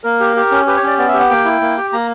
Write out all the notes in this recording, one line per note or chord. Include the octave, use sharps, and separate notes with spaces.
A#3 A#4
G4
G4
C#4
G4 B4
C#5
C#4 D5
B3 D5
E5
G4
F#5
A#3 G5
E4
A#3
G4
A#3 A#5